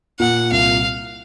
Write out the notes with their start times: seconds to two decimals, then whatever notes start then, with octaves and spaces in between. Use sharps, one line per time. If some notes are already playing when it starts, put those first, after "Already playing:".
0.20 A#2 F#5
0.51 C2 F5